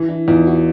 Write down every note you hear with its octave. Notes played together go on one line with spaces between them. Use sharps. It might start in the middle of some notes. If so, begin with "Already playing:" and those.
Already playing: E3
D4 E4
E2 D#4 F4
E4 F#4